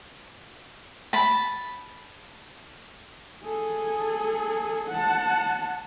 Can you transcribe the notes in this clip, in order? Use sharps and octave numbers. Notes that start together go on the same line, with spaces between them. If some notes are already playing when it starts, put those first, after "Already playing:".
A5 B5
G#4 A4
F#5 A5